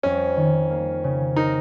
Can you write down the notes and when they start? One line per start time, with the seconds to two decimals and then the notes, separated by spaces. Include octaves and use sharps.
0.03 F2 C#4
0.37 D#3
0.71 A#3
1.04 C#3
1.36 D#4 A#4